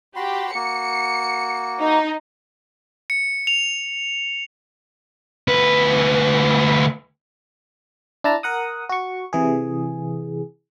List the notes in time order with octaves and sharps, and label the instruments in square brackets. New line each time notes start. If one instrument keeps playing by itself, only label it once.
[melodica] F#4 B5 C6 [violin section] G4
[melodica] A#3 F#4 [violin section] C#7
[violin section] D#4
[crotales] C#7
F7
[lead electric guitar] D2 B4
[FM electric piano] D4 E4 A5 A#5
A#4 F#5 D#6
F#4 C#6
C3 E3 G#4